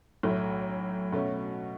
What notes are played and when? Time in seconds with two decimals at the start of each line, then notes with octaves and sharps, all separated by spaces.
0.23 B1 A2 A3
1.12 B2 A3 C#4